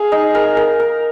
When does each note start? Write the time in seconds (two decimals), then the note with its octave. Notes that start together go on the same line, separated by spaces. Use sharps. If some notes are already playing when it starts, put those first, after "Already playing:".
Already playing: G#4 F5
0.12 D#4
0.35 A#4
0.57 A#4
0.80 A#4